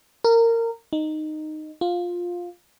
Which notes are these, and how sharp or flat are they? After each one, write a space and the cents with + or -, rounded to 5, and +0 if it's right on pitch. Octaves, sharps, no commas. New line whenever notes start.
A#4 -20
D#4 -10
F4 +10